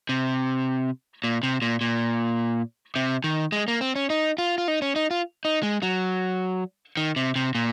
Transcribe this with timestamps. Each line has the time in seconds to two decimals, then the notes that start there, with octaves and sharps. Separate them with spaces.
0.09 C3
1.24 A#2
1.43 C3
1.62 A#2
1.81 A#2
2.96 C3
3.24 D#3
3.52 G#3
3.68 A#3
3.81 C4
3.96 C#4
4.10 D#4
4.38 F4
4.58 F4
4.68 D#4
4.82 C#4
4.96 D#4
5.11 F4
5.45 D#4
5.63 G#3
5.82 F#3
6.97 D#3
7.16 C3
7.36 C3
7.55 A#2